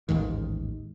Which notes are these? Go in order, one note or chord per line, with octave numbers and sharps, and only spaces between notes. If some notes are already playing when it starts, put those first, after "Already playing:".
A1 D#2 G#2 D#3